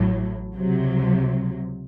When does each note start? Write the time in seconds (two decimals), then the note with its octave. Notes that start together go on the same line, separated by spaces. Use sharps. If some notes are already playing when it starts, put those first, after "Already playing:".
Already playing: A1 A2 F#3
0.54 C#2 C3 F#3